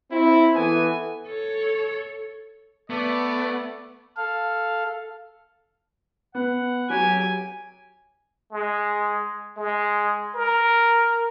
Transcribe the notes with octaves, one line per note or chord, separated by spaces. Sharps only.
C4 E4
E3 B3 A4 G#5
A4 C#5
A3 B3 D5
A4 F5
B3 F#5
F#3 G4 G#5
G#3
G#3
A#4